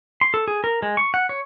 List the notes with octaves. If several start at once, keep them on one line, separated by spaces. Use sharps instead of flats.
C6
A4
G#4
A#4
G#3
C#6
F#5
C#5